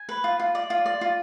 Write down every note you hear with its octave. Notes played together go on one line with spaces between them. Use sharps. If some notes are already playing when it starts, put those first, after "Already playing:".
Already playing: G#5
B4
F4
F4
D5
F4
D5
F4